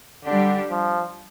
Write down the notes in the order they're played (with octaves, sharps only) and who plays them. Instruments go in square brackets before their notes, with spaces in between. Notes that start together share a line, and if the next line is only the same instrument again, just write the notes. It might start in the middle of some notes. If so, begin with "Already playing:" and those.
[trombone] D3 [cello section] G3 D4 G4
[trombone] F3